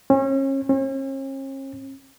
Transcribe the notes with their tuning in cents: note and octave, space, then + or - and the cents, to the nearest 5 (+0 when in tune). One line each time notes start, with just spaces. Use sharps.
C#4 -35
C#4 -45